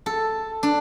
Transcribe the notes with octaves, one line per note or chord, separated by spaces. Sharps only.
A4
D4